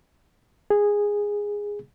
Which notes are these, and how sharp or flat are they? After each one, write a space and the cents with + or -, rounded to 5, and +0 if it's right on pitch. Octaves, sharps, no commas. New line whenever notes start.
G#4 -10